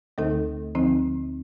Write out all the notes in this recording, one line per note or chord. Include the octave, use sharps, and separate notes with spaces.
D2 D3 A3 D#4 A4
D2 D3 F3 C4 D#4